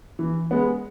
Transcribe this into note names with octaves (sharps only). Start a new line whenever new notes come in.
E3
G#3 B3